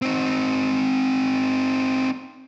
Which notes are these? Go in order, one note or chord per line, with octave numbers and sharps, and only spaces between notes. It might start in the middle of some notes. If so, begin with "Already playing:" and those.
C4 D#4